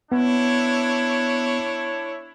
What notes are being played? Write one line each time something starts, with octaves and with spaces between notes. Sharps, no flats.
B3 D4 E4 C#5